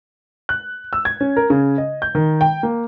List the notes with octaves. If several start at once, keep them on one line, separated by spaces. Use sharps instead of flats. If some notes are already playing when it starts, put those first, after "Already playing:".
F#6
E6
G#6
C#4
A#4
C#3
D#5
G6
D#3
G5
A#3